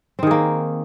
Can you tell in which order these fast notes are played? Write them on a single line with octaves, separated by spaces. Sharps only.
C4 D#3 G#4 A#3